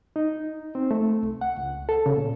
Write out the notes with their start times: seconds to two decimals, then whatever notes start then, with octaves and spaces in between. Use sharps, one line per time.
0.16 D#4
0.75 C4
0.91 A3
1.23 C2
1.41 F#5
1.57 C#2
1.89 A4
2.06 C#3
2.17 A#2